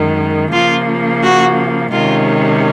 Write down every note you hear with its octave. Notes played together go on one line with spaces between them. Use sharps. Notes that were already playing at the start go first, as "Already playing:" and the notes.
Already playing: F#2 D#3 G#3
C#3 F3 A#3 F4
F#4
C3 D#3 G#3 C#4 F4